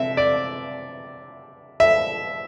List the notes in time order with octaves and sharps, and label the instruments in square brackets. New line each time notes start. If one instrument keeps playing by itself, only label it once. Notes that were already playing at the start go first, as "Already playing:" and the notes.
Already playing: [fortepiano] C3 E5
D5
E5